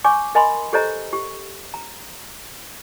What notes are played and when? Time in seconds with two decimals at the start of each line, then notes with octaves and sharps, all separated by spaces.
0.04 C#5 G#5 C#6 D6
0.35 A#4 D#5 G#5 B5 C6
0.73 G4 A4 C5 C#5 D#5 A#5
1.13 G4
1.74 A#5